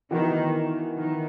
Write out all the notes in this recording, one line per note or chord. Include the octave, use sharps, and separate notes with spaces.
D#3 E3 B3 F#4 A#4
D#3